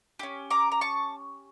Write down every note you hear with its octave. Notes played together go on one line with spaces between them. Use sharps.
C#4 G4
A#5 D6
A#5
A5 C#6